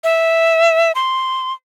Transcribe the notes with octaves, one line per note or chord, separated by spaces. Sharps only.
E5
C6